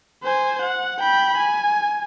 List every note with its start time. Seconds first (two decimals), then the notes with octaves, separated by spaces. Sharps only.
0.23 C5 G#5
0.62 F#5
1.00 G5 B5
1.38 G#5